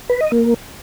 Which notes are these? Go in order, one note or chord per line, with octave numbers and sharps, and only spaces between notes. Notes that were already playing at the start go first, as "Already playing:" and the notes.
B4
D#5
A#3